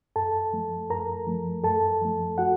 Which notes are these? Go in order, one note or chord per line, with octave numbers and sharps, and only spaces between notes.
F#2 A4 A5
F3 A3
F#2 A#4 A#5
F3 A3
F#2 A4 A5
F3 A3
F#4 F#5